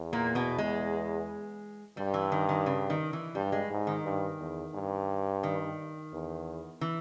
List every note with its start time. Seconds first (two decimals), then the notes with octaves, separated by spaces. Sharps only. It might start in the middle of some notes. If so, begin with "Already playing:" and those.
Already playing: E2
0.13 A#2 A#3
0.35 B2 B3
0.58 G#3
1.97 G2 G3
2.14 E3
2.32 D#3
2.49 D#3
2.66 C#3
2.90 D#3
3.13 E3
3.35 G2 G3
3.52 G#3
3.71 G#2
3.87 D#3
4.04 G2
4.39 E2
4.74 G2
5.43 D#3
6.13 E2
6.81 E3